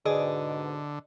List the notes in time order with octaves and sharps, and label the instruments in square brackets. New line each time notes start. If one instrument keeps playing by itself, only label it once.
[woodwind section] G#2 B2 [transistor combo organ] D3 [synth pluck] G#4 [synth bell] D5 D#5